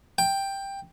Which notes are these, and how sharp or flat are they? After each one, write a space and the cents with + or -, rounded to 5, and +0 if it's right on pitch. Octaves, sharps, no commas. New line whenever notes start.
G5 +10